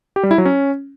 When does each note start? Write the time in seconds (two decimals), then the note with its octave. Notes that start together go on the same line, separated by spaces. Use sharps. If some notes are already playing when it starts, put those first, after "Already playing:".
0.16 G4
0.23 G3
0.31 E4
0.38 F#3
0.45 C#4